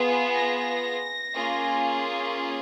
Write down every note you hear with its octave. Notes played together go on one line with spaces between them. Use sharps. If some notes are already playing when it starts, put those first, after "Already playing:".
Already playing: B3 F4 G#4
A#6
A#3 C#4 F4 G#4